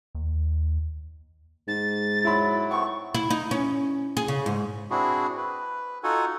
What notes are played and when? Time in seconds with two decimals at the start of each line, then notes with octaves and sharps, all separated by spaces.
0.15 D#2
1.68 G#2 A6
2.24 F#3 E4 B5
2.71 A3 B3 C4 C#6
3.14 E4
3.30 D#4
3.51 C#4
4.17 G#4
4.28 C#3
4.46 G#2
4.91 C4 D4 E4 F#4 G#4
5.37 B4
6.03 D#4 F4 F#4 A4 F#5 G#5